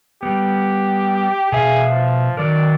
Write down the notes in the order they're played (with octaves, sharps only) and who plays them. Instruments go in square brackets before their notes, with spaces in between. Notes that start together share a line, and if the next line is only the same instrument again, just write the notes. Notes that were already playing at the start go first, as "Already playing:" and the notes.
[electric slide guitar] G3 B3 [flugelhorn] G4
[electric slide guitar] B2 E5 F5 [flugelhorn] G#4
[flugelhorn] F3
[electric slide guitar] D#3 F#3 A#4 [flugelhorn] D5